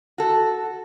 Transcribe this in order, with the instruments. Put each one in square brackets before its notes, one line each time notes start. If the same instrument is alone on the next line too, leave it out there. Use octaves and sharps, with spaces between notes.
[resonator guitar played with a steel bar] F#4 A4